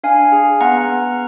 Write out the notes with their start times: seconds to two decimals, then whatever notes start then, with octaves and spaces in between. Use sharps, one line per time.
0.04 D4 F5 G#5
0.32 G#4
0.61 B3 F#5 A#5
0.89 B3